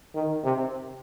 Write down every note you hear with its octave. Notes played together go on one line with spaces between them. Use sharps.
D#3
C3